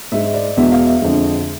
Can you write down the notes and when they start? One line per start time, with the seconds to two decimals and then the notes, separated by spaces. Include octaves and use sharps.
0.12 G#2 G#3 E5
0.34 D5
0.57 E2 B2 G#3 E5
0.72 F5
0.87 E5
1.02 F2 D3 G#3